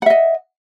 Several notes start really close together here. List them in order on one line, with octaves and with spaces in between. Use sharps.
F#5 E5 D#5